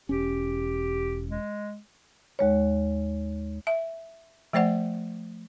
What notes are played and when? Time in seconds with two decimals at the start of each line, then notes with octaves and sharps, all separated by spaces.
0.09 E1 C#4 G4
1.30 G#3
2.39 D#2 G#3 C#5
3.67 E5
4.53 F3 A3 C5 D5 F#5